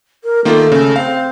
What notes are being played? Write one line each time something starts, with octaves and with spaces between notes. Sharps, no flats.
A#4
D#3 A3 A#3 F4
C#3
C4 F5